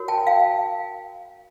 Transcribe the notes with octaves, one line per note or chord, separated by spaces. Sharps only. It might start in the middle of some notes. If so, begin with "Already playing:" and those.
Already playing: F#4 A#4 C#5
G5 A5
F5 G5